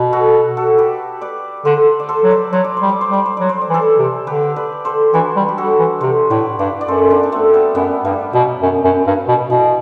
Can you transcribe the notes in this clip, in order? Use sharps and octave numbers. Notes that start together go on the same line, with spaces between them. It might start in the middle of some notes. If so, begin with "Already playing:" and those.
Already playing: B2 B4
F#4 A4
F#4 A4
G4 B4
B4 D5
D3 A4 C5
D5
A4 C5
F#3
B4 D5
F#3 C5
D5
C5
G3
D5
C5
G3 D5
C5
F#3 D5
C5
D5
E3
A4 C5
C3
D3 G4 B4
B4 D5
A4 C5
E3 D4 F#4
G3
G4
F#4 A4
E3
C3 A4 C5
A2 B4 D5
G2 B4 D5
D5
F#2 A4 C5
B3 D4
D4
A3 C4
G3 B3
F#2 G3 B3
G2 G3
B2 F#3
F#2
F#2
G2
B2
B2 E3